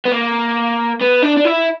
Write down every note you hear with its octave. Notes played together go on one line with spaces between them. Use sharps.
B3
A#3
B3
D4
D4
E4